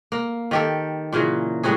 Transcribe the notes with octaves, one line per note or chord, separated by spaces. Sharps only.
A#3
D#3 G4 A4
A#2 C#3 E3 F#3
A2 G3 F#4 G#4